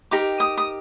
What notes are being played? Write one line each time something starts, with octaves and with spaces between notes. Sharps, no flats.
D#4 G4 A#4 D6
D#6
D#6